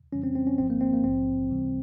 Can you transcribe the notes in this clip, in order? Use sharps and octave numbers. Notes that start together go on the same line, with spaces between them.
F2 C#3 E3 G3 C#4
C4
C4
C#4
G#1 G#2 F3 C4
A#3
C4
A#3
A#1 G#2 F3 C4
C#2 C3 E3 G3